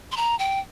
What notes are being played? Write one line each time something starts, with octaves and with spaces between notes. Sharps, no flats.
C6
A#5
G5